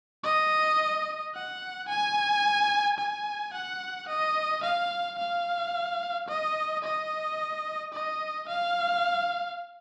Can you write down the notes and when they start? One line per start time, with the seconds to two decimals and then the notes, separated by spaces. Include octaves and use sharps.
0.24 D#5
1.35 F#5
1.89 G#5
2.99 G#5
3.54 F#5
4.09 D#5
4.63 F5
5.19 F5
6.28 D#5
6.84 D#5
7.93 D#5
8.48 F5